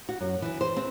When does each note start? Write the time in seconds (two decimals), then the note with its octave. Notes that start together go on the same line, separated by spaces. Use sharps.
0.09 F#4
0.20 F#2
0.42 E3
0.61 C5
0.77 C4